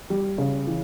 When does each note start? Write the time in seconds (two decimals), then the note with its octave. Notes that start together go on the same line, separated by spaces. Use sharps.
0.10 G3
0.38 C#3
0.67 E3